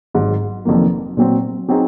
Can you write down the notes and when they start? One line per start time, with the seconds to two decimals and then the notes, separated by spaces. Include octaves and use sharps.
0.14 G#1 G#2 F#3
0.65 F1 F2 D#3 F#3 A#3
1.17 A#2 F#3 C4
1.69 F#3 C4 D#4 G#4